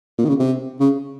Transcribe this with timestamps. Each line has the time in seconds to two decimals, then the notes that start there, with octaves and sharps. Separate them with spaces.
0.18 A#2
0.25 D#3
0.29 C#3
0.39 C3
0.80 C#3